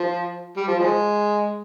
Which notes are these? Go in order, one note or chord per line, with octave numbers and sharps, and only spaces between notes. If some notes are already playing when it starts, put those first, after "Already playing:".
Already playing: F3
G3
F3
F3 G#3